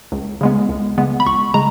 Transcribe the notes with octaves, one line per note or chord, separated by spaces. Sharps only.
C#2
C#3 G#3 B3
C#2
C#3 G#3 B3
B5
C#2 C#6
C#3 G#3 A#5